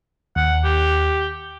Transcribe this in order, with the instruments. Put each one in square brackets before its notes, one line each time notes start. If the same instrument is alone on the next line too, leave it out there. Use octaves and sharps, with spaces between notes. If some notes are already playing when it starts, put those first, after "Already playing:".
[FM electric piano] D#2 [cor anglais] F#5
[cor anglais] G4